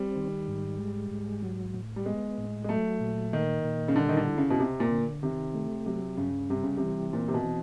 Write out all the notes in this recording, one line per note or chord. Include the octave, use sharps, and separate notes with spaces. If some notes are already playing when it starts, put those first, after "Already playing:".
Already playing: G3 C4
D#3
G#2
G#3
G#2
F#3
A2
G3
G#3 B3
A2
G#3
F#3 A3
A#2
D#3 A#3
A#2
C#3
D3 G3
D#3
D3
E4
C#3
B2
C3 C4
A#2
D3
C3 D#3
A3
C3 F#3
G2 C#3
C3 G3
C#3
C3 E3
A#2 C4
C3
B2
E3